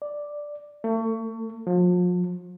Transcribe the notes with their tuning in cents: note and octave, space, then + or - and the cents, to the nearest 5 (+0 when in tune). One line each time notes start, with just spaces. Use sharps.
D5 +0
A3 +35
F3 +40